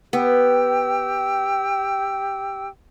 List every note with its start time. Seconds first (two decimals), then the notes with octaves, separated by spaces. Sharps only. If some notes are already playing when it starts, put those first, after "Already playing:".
0.13 B3 G4 G5 E6